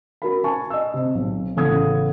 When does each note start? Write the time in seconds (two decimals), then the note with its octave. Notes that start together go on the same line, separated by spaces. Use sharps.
0.22 C#4 F#4 A#4 B5
0.44 G#5 A5 C#6
0.70 D#5 E6
0.94 C3
1.15 B1
1.56 A1 C#3 B3 A4 D#6 G#6